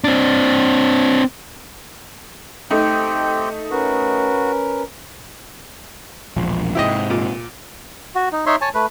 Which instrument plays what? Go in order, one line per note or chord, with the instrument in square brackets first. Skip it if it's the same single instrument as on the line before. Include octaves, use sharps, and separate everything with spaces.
[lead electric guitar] C4 D4
[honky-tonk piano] A3 D#4 [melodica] C4 G4 G5
[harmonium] C#4 A#4 B4 [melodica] F#4
[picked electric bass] E1 A#1 F3
[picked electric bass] G#2 C3 [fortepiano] E4 G4 D#5
[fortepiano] A#2
[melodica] F#4
D#4
D#4 C#5 E5 C6
C#5 G#5 A5
A3 B4